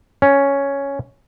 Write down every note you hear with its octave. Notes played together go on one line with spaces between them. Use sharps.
C#4